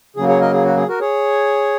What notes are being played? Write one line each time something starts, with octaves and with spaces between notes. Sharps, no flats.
C#3 F#3 A#3 G#4
G#4 C#5
A#4 D#5
G#4
F#4
G#4
F#4 A#4
G#4 C#5